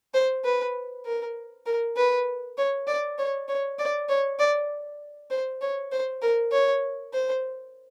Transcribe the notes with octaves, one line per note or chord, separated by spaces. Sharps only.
C5
B4
A#4
A#4
B4
C#5
D5
C#5
C#5
D5
C#5
D5
C5
C#5
C5
A#4
C#5
C5